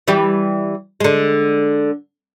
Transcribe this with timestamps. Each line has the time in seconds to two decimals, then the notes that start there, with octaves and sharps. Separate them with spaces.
0.08 E3 G3 G4
1.00 D3 G#3